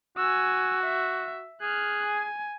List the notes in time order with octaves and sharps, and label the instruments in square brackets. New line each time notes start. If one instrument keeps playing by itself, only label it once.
[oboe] F#4 [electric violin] G#5 E6
[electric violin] E5
[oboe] G#4 [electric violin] F6 F#6
[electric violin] G#5